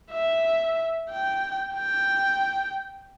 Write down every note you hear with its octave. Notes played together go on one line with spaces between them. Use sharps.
E5
G5
G5